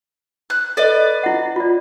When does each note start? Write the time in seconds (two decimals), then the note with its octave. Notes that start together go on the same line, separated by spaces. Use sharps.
0.50 F#6
0.77 A4 B4 D5 D#5
1.23 E4 F#5
1.56 F4 D5